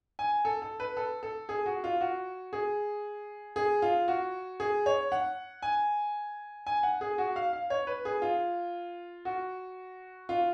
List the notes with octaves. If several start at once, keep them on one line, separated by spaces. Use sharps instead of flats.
G#5
A4
A4
B4
A4
A4
G#4
F#4
F4
F#4
G#4
G#4
F4
F#4
G#4
C#5
F#5
G#5
G#5
F#5
G#4
F#4
F5
F5
C#5
B4
G#4
F4
F#4
F4